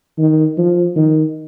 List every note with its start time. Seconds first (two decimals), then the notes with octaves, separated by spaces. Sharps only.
0.18 D#3
0.58 F3
0.96 D#3